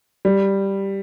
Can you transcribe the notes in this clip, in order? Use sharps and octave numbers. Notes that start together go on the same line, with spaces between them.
G3